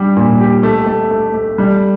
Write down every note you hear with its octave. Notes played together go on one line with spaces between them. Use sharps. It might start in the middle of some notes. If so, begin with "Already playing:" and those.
Already playing: G3 D4 G4
A#2
G4
A3
A3
A3
A3
G3